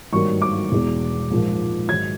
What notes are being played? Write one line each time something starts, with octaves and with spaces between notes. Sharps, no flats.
G#1 G2 D#3 F#3 A#3 C#6
D6
E1 E2 B2
A#1 G#2 F3 A#3
G#2 D#3 F#3 G#6